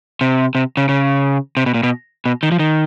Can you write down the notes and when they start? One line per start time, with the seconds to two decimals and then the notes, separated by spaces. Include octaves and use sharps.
0.21 C3
0.55 C3
0.77 C#3
0.89 C#3
1.57 C3
1.66 B2
1.74 A#2
1.83 B2
2.26 B2
2.43 D#3
2.52 F3
2.59 D#3